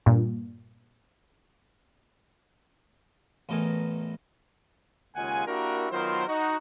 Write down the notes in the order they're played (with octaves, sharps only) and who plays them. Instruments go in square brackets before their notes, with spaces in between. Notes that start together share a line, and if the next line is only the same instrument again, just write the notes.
[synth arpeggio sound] G2 A#2
[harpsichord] A1 E2 A3 D#4 A#4 G#5
[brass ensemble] D#2 C#3 G#3 F4 F#5 G#5
A#3 D4 E4 F#4 G4 A#4
D#3 F#3 B3 F4 A#4 C5
D#4 F#4